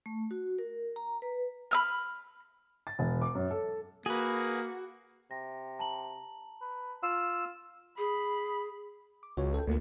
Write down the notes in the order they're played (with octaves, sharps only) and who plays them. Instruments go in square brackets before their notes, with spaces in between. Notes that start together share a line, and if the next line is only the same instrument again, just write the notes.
[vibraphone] A3
F#4
A#4
A#5
B4
[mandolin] B5 E6 F6
[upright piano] A6
E1
D6
F#2
A4
[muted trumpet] A#3 [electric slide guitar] F#4 [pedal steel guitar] G#4 B4
[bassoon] C3 [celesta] A#6
[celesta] A5 A#5 F#7
[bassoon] B4
[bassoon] F4 [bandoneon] E6
[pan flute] G#4 [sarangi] B5
[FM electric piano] D6
[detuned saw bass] C#2 [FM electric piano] F#4 C#5
[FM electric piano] A4 G5
[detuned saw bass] D2 [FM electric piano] A3 A#3 F4